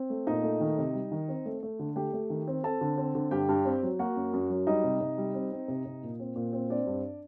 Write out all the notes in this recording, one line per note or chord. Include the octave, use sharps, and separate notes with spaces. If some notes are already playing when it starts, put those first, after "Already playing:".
Already playing: C4
A3
A#2 D#4 D#5
A3
D#3
C3
G3
D#3
C4
A3
A3
D3
A3 G4 G5
A3
D#3
C4
C4 A4 A5
D3
C4
D3
G2 G4 G5
G2
C4
F#3
A#3 F#4 F#5
F#2
F#2
F#3
G3 D#4 D#5
C3
C3
G3
C4
C4
C3
C3
A#2
C4
A#2
C4
C4 D4 D5
G2